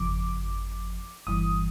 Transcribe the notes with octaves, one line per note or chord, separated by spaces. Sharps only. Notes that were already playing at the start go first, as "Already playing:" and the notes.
Already playing: G1 F2 C#3 F3 D6
G1 G2 E3 D#6